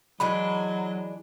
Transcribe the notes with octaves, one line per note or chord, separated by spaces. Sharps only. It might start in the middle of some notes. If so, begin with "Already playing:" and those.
E3 F#3 G#3 D4 D#5 B5